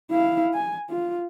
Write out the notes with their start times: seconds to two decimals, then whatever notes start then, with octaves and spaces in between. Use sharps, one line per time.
0.11 E4 F5
0.54 G#5
0.89 F4